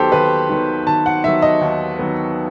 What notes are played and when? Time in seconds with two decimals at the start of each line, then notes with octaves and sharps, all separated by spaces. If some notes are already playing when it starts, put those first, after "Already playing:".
Already playing: D#2 D#3 F#3 B3 G4 A4 C5
0.12 D#2 B4
0.49 D#3 F#3 B3
0.86 D#2 A5
1.06 F#5
1.24 D#3 F#3 B3 E5
1.42 D#5
1.61 D#2
1.99 D#3 F#3 B3